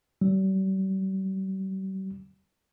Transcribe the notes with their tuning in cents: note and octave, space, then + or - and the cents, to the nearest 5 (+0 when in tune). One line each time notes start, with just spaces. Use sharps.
G3 -45